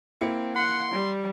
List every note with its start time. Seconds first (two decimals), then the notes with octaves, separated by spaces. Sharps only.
0.21 A#3 C4 E4 C#7
0.56 F#5 C6
0.92 G3